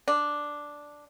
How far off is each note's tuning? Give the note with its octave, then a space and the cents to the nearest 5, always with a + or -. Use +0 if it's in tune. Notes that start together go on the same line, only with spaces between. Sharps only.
D4 +0